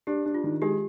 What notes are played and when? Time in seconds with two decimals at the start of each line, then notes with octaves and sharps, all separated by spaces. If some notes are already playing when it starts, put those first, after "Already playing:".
0.07 D4 G4
0.26 D4
0.34 F4
0.44 D#3
0.62 G#3 G4